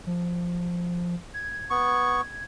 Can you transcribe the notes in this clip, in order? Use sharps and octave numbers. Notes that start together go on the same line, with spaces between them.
F3
G#6
B3 C#6